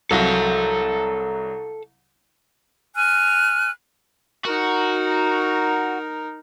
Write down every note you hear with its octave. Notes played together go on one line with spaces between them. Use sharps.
C2 F#3 A4 F5
G#5 F6 F#6
D#4 F#4 A#4